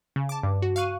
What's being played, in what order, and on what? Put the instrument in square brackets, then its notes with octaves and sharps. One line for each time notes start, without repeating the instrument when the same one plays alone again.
[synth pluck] C#3
A5 D6
G2
F#4
F5 C#6 F#6 D#7